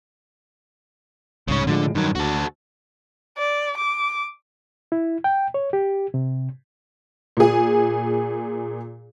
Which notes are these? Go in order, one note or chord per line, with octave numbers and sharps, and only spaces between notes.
C2 G#2 C#3 C#4
A2 D3 F3 G#3
G2 D#3 F#3
D2 F#4 A4
D5
D6
E4
G5
C#5
G4
C3
A#2 G#4